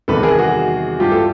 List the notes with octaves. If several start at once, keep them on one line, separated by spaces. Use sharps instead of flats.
E2 C3 D#3 G3 A4 B4
G#4 A#4
F#4 G#4
G2 E3 G3 F4 G4
A4